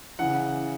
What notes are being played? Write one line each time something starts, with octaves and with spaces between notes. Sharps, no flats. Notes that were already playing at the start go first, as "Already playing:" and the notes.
C#3 E3 F#5